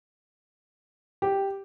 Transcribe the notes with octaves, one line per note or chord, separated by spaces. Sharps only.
G4